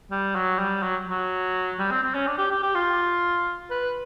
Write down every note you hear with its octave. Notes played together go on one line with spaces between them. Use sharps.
G3
F#3
G3
F#3
F#3
G3
C4
C4
C#4
D4
G4
G4
G4
F4
B4